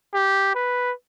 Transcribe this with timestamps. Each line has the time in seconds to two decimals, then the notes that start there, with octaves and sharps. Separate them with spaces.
0.14 G4
0.55 B4